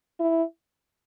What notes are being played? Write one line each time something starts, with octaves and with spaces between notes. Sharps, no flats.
E4